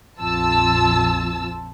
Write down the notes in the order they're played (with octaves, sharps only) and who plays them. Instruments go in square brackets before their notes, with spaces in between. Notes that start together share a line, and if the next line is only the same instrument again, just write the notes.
[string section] A#1 F2 F4 A5 E6